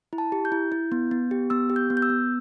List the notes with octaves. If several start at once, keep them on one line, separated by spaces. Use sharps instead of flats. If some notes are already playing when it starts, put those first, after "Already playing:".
E4
A5
G4
G6
E4
E4
B3
B3
G4
B3 E6
G4
G6
B3
G6
E6
B3